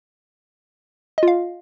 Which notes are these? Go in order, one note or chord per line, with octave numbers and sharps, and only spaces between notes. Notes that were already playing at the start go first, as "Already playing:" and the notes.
F4 D#5 F5